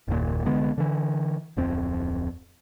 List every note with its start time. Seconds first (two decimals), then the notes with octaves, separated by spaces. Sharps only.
0.08 F#1 D#2 A#2
0.45 C2 D3 G#3 B3
0.78 D3 E3
1.57 D1 F2 C4